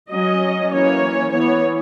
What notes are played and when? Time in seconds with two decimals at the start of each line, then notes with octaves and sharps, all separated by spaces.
0.12 F#3 C#4 D#5
0.72 E3 A#3 C#4 C#5
1.32 E3 B3 C#5